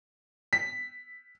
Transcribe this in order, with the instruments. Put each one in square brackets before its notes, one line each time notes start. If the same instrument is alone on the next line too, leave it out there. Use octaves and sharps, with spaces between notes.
[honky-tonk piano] B6